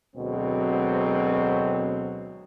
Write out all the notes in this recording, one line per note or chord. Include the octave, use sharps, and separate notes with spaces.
D2 B2 F#3 G#3 C4